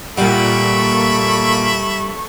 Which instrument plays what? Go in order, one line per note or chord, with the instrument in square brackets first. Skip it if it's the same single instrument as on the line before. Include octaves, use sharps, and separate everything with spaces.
[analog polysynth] A#2 D7 [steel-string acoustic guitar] G3 F#5 [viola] A4 C#6 [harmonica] E5 B5